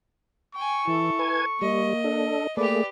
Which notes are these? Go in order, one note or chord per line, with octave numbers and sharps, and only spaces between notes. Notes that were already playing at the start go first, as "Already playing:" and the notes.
G5 G#5 C#6
E3 E4 A4
B4 G#5 G#6
G3 A#3 D#5
D4 A4
A3 A#3 G4 G#4 B4 D5